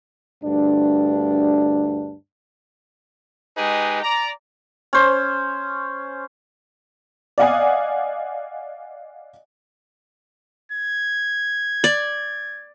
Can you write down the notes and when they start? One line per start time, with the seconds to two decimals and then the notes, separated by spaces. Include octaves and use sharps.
0.44 D2 G2 D4
3.57 G#3 D#4 G4 G#4 B4
4.02 D5 A#5
4.93 C#4 C5
7.38 D5 D#5 F5 F#5 G#5 D#6
10.71 G#6
11.84 D5